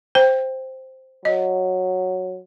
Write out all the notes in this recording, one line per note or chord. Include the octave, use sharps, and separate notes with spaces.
C5 G5
F#3 D#5